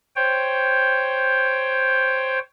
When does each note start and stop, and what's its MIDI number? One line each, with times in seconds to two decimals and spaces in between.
0.16 2.39 72
0.16 2.39 73
0.16 2.39 79